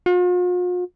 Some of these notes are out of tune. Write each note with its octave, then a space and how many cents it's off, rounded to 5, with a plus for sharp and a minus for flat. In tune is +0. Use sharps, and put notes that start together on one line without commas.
F4 +45